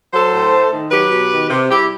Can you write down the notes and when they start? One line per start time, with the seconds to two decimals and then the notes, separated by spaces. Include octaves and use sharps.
0.13 F#3 A4 C5
0.33 A2
0.52 A3
0.72 D#3
0.91 F#3 G4 B4
1.11 B2
1.32 D#3
1.50 C3
1.70 G3 E4 G4